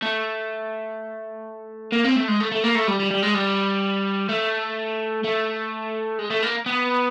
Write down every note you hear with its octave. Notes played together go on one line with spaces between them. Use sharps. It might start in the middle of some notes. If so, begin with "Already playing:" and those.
A3
A#3
C4
A3
G#3
A3
A3
A#3
A3
G3
G3
G3
G#3
G3
A3
A3
G#3
A3
A#3
B3